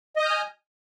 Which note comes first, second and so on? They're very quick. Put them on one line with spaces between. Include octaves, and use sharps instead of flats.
D#5 D#6 G6 F6 G#5